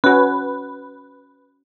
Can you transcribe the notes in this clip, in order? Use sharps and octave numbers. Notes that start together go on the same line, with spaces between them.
C#4 F#4 B4